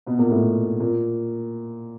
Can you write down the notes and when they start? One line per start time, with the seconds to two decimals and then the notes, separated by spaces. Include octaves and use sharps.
0.06 B2 B3
0.18 A#2 A#3
0.31 A2 A3
0.80 A#2 A#3